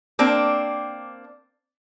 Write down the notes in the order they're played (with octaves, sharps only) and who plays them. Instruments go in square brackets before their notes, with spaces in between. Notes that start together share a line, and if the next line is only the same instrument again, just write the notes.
[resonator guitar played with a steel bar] A#3 C4 D4